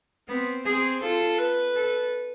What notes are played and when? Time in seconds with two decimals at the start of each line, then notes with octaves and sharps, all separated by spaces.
0.28 B3 C4
0.65 C4 G#4
1.02 F4 A4
1.38 B4
1.76 A4